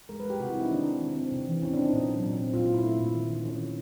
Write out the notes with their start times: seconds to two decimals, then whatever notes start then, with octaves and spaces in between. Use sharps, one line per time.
0.09 G#3 A#4
0.20 B4
0.25 G#3 G4
0.40 C3 F#4
0.50 E4
0.55 C4
0.61 D#4
0.70 D#3 D4
0.86 C4
1.01 D#3
1.16 C4
1.32 C3
1.47 E3
1.62 C4 C#4
1.73 D4
1.77 C4
1.82 D#4
1.93 A#2
2.08 F#3
2.23 A#2
2.38 C4
2.53 A#2 F4
2.64 F4
2.69 A#2
2.74 E4
2.84 A3
2.99 A#2
3.15 D#3
3.30 D#3
3.45 D#3 C#4
3.61 D#3